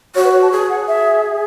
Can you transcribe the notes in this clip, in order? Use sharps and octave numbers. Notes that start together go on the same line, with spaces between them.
F#4 C#5
B4
C#5
A5
G#4
F#5
E5